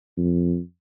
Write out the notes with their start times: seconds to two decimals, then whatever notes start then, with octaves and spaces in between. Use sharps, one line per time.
0.17 F2